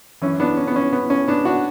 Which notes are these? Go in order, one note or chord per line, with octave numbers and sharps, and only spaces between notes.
F#2 E3 C#4
B3 D4
C#4
B3
C#4
B3
C#4
B3 D4
D4 F#4